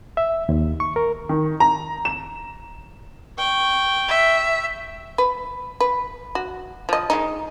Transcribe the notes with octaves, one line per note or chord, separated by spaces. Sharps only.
E5
D#2
C#6
A#4
D#3
A#5
E7
G5 C#6
E5
B4
B4
F#4
F3 D#5
D#3 G#3 D#4